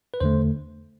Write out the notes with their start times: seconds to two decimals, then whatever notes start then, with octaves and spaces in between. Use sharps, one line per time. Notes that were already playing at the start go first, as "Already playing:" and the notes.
0.14 B4
0.20 E2 D3 A3 C5